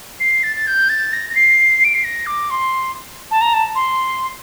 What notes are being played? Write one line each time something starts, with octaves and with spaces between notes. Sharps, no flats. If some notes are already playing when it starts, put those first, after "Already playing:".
C7
A6
A6
G6
A6
A#6
A#6
C7
D7
C7
A#6
D6
C6
A5
A#5
A5
C6